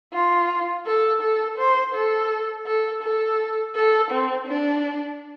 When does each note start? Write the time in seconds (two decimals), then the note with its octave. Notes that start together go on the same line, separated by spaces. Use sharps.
0.13 F4
0.86 A4
1.22 A4
1.58 C5
1.94 A4
2.67 A4
3.03 A4
3.75 A4
4.11 C4
4.47 D4